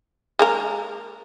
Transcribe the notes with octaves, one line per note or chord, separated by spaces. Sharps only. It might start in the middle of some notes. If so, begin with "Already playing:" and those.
G#3 A#3 A#4